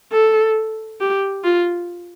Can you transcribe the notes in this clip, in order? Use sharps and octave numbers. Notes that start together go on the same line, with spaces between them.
A4
G4
F4